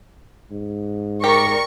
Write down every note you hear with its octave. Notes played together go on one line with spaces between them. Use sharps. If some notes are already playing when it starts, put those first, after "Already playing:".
G#2
G4 A#4 D5 C#6